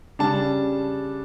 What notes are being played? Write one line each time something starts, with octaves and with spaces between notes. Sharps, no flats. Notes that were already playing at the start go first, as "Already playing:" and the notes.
C#3 G3 D4 A5